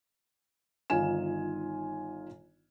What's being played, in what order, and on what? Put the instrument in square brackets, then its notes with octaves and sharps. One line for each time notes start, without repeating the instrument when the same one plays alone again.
[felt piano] G1 D#3 D#4 F4 G#5 E7